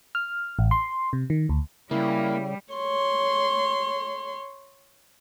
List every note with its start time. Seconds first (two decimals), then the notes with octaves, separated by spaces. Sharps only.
0.15 F6
0.59 A1
0.71 C6
1.13 C3
1.30 D#3
1.49 D2
1.91 C#3 G3 A#3 E4
2.74 C#5 C6